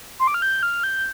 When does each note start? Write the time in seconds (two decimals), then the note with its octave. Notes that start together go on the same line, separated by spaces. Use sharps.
0.19 C6
0.27 D6
0.34 F6
0.42 G6
0.63 F6
0.83 G6